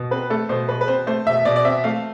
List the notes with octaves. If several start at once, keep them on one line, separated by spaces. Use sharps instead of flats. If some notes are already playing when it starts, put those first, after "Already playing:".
Already playing: B2
C4 B4
A3 A4
B2 C5
B2 B4
B4
C4 C5
A3 C5
B2 E5
B2 D5
D5
C4 E5
A3 F5